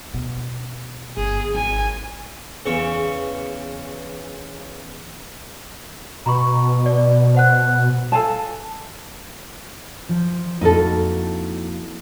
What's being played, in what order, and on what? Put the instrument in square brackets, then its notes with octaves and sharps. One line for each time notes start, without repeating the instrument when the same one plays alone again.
[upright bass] B2
[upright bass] G1 [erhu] G#4
[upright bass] G#1 [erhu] G#5
[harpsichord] E2 C#3 C#6
[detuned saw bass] B2 [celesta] A#5 B5 C#6
[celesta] D5
C5 F#5 F#6
[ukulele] A4 F5 G#5 A5
[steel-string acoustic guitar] F3
[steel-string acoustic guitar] F2 A#3 F#4 [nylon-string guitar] D#4 E4 A4